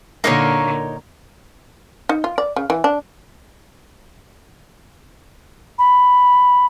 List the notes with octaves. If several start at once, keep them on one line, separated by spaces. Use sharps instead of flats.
A#2 D3 A#3 D#4 A#4 C#5 C#6
D#4
F4
D5
C#3
E3
D4
B5